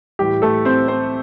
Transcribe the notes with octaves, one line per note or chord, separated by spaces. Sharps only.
A2 E3 G3 G4
A3 A4
C4 C5
C4 C5